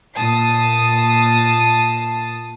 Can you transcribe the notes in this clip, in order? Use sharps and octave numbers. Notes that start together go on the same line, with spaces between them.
A#2 A5 D#6 C7